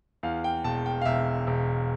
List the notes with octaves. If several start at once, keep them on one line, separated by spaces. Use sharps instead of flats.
E2 F5
G5
E1 A5
G5
F5
E1 E5
E1